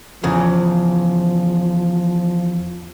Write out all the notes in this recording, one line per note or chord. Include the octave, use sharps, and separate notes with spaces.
E2 C#3 F3